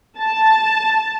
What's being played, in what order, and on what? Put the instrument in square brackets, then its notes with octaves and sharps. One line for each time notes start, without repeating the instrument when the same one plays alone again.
[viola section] A5